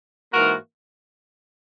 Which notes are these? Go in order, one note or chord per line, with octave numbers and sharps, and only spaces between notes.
G#2 E3 A#3 F#4 A#4